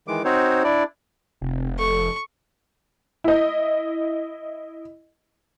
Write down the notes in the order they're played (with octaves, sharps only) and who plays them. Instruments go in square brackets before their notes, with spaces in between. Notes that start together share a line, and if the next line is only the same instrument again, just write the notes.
[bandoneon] D#3 E3 G#3 D6
C4 D#4 F#4 C5 C#5
D4 E4 D5
[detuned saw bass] F1 [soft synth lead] C3
[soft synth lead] A4 [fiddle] C#6
[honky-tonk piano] E4 D#5